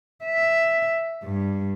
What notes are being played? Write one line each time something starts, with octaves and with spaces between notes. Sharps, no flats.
E5
G2